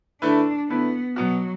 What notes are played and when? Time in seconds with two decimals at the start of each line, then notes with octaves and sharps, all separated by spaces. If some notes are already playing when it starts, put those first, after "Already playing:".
0.22 D3 A3 D4 E4 B4
0.69 D3 A3 B3 E4 B4
1.16 B2 F#3 B3 F#4